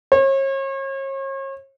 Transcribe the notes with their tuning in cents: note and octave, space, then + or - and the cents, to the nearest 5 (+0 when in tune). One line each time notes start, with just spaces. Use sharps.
C#5 -40